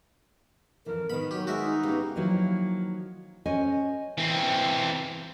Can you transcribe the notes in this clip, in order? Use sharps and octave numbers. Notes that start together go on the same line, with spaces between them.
F2 E3 A#4
D#3 B3 B5
F#3 G4
G#3 F#4 A#4 E5
D#4
B3 C#4 G4 F5
D#3 F3 F#3 A#3 E4
C#4 C5 D#5 G#5
E3 C4